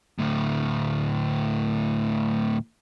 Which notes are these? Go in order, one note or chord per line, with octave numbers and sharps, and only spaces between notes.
D2 A2